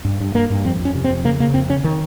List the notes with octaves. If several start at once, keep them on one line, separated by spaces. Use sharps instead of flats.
G2
G2
G2 A#3
G2
F2 C4
F2
C#4
C3
C4
F2
C#3 A#3
C#3 A#3
F2 C4
C#3 C#4
D#3